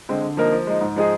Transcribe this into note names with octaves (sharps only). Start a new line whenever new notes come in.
D3 G#3 C4
D3
F3 A#3 D#4 A#4
F3
G#3 D#4
G#2
F3 G#3 D#4 G#4